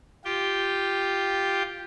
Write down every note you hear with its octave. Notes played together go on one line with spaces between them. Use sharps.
F4 G4 G5